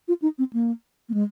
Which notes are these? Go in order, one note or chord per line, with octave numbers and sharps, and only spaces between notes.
F4
D#4
C4
A#3
A#3
G#3